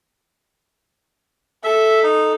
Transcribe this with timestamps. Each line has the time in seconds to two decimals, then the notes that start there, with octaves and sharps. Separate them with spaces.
1.64 A4 E5
2.03 D#4